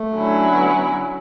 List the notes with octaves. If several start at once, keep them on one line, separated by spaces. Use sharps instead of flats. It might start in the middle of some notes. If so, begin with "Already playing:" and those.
Already playing: A3
D3 F#3 C#4 E4
A3
B3